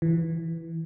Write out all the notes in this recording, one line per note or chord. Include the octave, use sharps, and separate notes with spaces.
E3